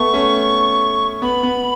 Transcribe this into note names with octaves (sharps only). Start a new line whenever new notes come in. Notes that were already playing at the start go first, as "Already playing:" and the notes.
Already playing: A3 B3 C#6
A3 C#4
B3 B5
B3